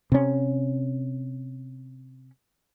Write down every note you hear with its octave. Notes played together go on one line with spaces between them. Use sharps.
C3 C#4